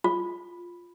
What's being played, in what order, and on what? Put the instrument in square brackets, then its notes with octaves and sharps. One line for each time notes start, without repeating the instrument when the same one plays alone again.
[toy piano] F4